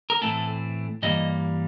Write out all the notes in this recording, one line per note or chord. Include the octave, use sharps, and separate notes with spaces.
A#4
A2 E3 A3 C4 A4
G2 E3 G3 A#3 D#5